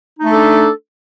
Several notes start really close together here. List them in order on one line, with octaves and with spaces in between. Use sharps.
D#4 A3 A4 D4